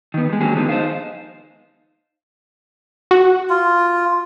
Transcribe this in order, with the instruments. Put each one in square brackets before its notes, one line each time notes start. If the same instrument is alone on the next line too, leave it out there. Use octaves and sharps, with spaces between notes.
[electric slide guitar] D#3 B3
G3 G#3
D3 F#3 A#3 C#4 G4 G#4
D3 D#3 F3 G#3 B3 D#4
D#4 C5 D#5 F5
[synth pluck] F#4
[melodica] F4